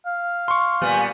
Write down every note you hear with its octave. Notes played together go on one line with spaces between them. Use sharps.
F5
C6 C#6
A#2 G3 B3